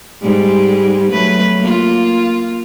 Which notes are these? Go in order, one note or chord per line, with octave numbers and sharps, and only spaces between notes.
G#2 G3 G#3
F#3 A3 B4
A#3 F4